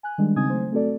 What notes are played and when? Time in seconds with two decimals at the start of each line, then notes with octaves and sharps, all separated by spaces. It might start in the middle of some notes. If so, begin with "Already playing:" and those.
0.03 G#5 F#6
0.18 D#3 G3 G#3 D4
0.36 C#3 C4 D#4 G#5 D#6 G#6
0.50 F#3 A3 C5
0.72 A3 C4 F#4 A4 D5